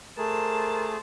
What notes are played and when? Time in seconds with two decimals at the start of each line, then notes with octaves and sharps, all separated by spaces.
0.18 A3 G#4 A#4 C5 A5